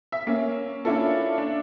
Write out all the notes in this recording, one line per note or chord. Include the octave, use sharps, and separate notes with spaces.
E5
A#3 C#4
A#3 C#4 D4 E4 F4 A4
D4